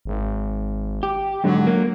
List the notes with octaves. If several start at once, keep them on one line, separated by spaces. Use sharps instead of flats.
G#1
G4
G#2 D3 F#3
A#3